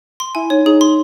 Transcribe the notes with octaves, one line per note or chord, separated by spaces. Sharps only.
C6
E4 G#5
D#4 C#5
D#4 G#4
C6